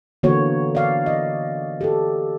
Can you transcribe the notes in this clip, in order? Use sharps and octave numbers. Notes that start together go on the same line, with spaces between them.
D3 E3 A#3 B3 F#4 C#5
D5 F5
D#5
G4 A4